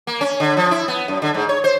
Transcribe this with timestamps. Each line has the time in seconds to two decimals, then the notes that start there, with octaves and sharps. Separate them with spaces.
0.07 A#3
0.21 C#4
0.40 D3
0.57 F3
0.71 E4
0.88 B3
1.08 F#2
1.22 D3
1.34 G#2
1.49 C#5
1.64 C5